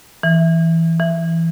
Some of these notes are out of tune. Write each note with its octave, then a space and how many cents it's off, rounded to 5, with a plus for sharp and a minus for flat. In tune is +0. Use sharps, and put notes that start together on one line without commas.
E3 +0
E3 +10